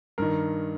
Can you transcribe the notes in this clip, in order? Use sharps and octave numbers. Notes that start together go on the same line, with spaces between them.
G2 D#3 A#4